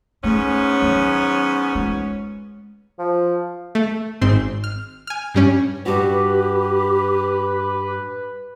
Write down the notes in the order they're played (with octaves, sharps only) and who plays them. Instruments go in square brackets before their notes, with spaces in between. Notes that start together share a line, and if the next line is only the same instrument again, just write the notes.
[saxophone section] G#2 B3 C#4 [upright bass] A3
[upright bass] D#3 F#3
G#3 F4
[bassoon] F3
[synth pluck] A3
G#1 G#2 C4 C6
F6
G#5 F6
G2 G3 C#4
[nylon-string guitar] G2 F#4 [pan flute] G4 [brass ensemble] B4